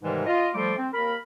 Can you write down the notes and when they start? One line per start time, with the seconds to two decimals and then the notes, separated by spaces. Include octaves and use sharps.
0.02 G#2 C3 D#3 E3 G3 G#3
0.26 F4 D#5
0.55 F3 G3 A3 A4 C6 D6
0.77 C4
0.93 D#2 A#4 B5